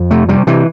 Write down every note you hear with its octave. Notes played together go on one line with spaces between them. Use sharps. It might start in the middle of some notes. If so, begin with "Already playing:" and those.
Already playing: F2
C3 A3
C3 G3
C3 E3